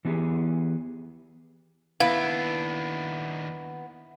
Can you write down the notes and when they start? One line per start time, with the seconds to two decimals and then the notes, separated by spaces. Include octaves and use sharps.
0.05 E3 B3 D#4 E4 G4 G#4
2.00 D#2 B3 D4 E4 F5